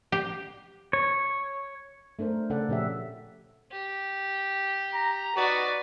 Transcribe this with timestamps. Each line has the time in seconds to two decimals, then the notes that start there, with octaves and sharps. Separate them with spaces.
0.12 G4
0.93 C#5
2.19 A3 D4 A#4 C5
2.50 C#3 A3 C#4 A4 D5 F#5
2.69 A#2 C#3 F3 C#4 G4 E5
3.72 G4
4.93 A#5
5.35 D#4 F#4 B4 D5